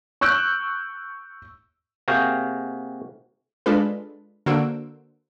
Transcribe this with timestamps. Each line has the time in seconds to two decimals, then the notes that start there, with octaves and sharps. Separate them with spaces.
0.21 C#6 E6 F#6 G6 D7
2.08 C3 A#3 F#4 G#4 F5 G5
3.66 G#3 D4 F4 A4 B4
4.46 D3 A#3 F#4 C5 E6 D7